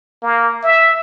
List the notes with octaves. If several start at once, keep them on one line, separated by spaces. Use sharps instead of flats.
A#3
E5